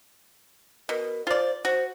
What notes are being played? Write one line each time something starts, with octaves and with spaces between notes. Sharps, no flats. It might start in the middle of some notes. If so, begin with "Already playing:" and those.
B2 A#4
F4 C5 D5
F#4 C5